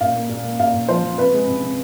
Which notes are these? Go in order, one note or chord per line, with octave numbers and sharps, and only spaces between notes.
A#2 F5
A#3
A#2
A#3
A#2 F5
A#2
F3 C5
F3
C3 B4
G#3
C3
C3